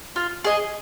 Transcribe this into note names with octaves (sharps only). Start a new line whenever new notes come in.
F4
G#4 D#5